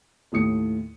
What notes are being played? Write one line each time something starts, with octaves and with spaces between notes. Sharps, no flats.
D#2 A2 A3 D#6 C#7